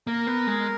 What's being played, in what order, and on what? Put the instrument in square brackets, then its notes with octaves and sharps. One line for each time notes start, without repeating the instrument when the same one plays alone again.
[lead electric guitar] A#3 [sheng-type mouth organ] A#4
[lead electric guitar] B3
G#3